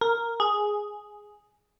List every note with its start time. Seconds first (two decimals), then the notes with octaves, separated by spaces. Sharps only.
0.01 A#4
0.40 G#4